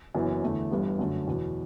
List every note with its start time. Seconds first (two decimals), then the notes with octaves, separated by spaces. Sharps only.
0.14 F#1 F#2 E3 B3 E4
0.43 E2 D3 A3 E4
0.71 G1 G2 E3 G3 B3
0.99 F#2 D3 A3
1.27 E2 B2 F#3